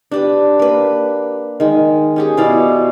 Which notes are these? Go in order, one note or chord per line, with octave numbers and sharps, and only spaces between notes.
D4 G4 B4
A#3 B4
D#3 G#3
C#4 G4 G#4
B2 E4 D5 F5